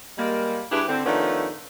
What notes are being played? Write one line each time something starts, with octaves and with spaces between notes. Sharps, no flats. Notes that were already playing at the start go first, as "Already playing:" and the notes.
G3 G#3 A#3
G2 D4 E4 G4 G#4 B4
D3 C4
D#3 F3 A3 B3 C#4 D4